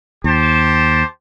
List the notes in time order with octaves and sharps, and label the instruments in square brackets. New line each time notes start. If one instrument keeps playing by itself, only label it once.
[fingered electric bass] D#2 [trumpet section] G4 C5 A5